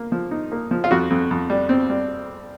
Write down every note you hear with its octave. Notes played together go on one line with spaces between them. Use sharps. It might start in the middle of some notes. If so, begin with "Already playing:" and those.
Already playing: A#3
F3
D#4
A#3
F3
F4
F2 F#4
F2
F2
G3
C4
G3